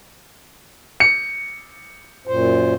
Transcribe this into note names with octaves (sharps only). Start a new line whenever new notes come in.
C#7
F#2 A#2 C5